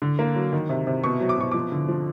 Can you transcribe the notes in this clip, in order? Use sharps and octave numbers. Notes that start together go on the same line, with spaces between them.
D3
A#3
F#3
D#3
C3
C3
B2 C#6
F#3
D6
B2 C#6
F3 D6
D3
F3